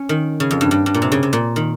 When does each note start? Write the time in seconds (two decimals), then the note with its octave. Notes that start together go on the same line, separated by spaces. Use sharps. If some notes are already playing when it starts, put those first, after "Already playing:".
Already playing: C#4
0.09 D#3
0.40 C#3
0.51 F2
0.61 G2
0.71 G2
0.86 G2
0.94 A#2
1.02 C3
1.12 C#3
1.23 C3
1.33 A#2
1.56 D#3